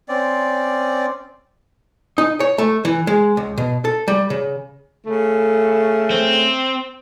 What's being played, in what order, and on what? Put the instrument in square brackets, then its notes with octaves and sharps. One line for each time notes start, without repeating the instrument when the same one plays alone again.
[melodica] C4 C#4 D5
[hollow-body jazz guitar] D#4
C#5
A3
E3
G#3
C#2
B2
A4
G3
C#3
[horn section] C#3 A3
[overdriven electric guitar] C4